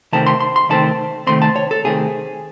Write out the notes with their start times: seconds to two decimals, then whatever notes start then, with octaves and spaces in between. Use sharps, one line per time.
0.12 C3 D#3 A3 C4 A5
0.27 C6
0.40 C6
0.56 C6
0.69 C3 D#3 A3 C4 A5
1.27 C3 D#3 A3 C4 C6
1.42 A5
1.56 C#5
1.71 A4
1.84 C3 D#3 A3 C4 G#4